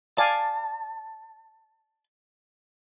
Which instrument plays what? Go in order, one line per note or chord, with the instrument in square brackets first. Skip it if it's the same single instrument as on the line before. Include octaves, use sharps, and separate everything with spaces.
[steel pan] D5 F5 G#5 [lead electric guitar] A5